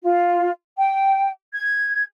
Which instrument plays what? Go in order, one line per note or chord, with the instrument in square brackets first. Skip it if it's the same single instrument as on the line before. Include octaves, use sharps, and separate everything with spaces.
[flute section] F4
G5
G#6